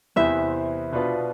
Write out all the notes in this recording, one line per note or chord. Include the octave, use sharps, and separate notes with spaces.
E2 C3 E3 B3 E4 C5 E5
B2 B3 D4 F4 B4